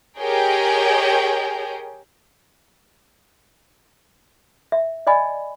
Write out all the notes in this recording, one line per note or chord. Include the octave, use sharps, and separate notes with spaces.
G4 G#4 A#4 C#5 D#5 G5
E5
D5 D#5 G#5 B5